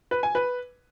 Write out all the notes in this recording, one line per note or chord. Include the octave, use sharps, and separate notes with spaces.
B4
G#5
B4